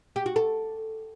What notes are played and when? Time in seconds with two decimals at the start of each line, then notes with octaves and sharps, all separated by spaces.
0.16 G4
0.26 F#4
0.36 A4